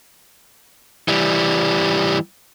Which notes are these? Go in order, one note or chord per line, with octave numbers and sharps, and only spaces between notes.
E3 G3